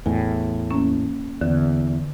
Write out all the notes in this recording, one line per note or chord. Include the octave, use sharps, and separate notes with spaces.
E2 A2 G#5
A#3 C#4
E2 D3